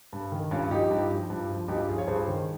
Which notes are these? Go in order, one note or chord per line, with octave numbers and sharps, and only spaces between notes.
G2
D#3
G2 C#4 F4
F3 D#4 G4
G2
F3
G2
F3
G2 D#4 G4
F3 F4 G#4
C#5
G2 G#4 C5
D#3